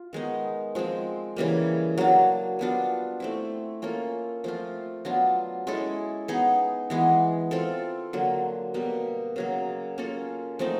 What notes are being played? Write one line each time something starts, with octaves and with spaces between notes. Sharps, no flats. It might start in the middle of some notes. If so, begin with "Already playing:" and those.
Already playing: F4
D#3 G#3 B3 D#4
F3 G#3 C4
C#3 E3 G3 A#3
F#3 A#3 D4
G3 B3 D4 F4
A3 C4 E4
A#3 C#4 F4 A4
F3 A3 C4 F4
F#3 B3 D4 F4
G#3 C#4 E4 A4
B3 D#4 G#4
E3 G#3 B3
C4 F4 A4
D3 F#3 A#3
B2 G3 A#3
C#3 F#3 A#3
A#3 C#4 F4 A4
F3 A3 C4 D#4